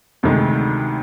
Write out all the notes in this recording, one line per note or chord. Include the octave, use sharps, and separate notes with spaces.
D2 C3 D#3 G#3